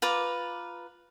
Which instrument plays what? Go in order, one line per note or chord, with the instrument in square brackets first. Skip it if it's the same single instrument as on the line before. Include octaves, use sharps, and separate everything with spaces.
[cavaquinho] F4 B4 A#5 D6